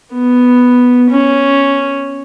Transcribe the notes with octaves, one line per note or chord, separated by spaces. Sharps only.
B3
C#4